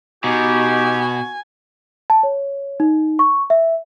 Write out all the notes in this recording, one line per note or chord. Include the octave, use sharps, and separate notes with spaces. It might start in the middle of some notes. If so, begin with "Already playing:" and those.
B2 D#4 F#4 G4 G#5
A5
C#5
D#4
C#6
E5